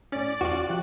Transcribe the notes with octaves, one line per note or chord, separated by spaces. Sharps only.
A2 C#4 D5
E2 F4 F#4
C3 F3 F#6